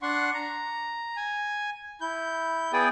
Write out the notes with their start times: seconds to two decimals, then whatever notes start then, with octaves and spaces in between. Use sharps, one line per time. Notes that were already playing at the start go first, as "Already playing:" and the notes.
0.02 D4 F#5 C6 C#6
0.34 A#5
1.17 G#5
2.01 E4 G6
2.73 B3 E4 G#4 D5 G5 D#6